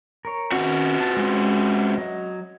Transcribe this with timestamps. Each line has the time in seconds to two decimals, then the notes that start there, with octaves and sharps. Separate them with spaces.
0.25 A#4 C#5
0.52 C3 D#3 C#4 F#4
1.01 A5
1.17 G#3 C#4 C6
1.97 F#3 D#5